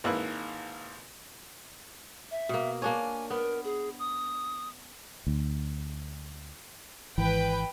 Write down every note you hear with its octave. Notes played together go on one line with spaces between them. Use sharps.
G#1 A#3 E4 B4 F#6
E5
B2 A#3
A#3 D4 C#5 G#5
B3 A#4
G#4
D#6
D2
G#1 E3 B4 G5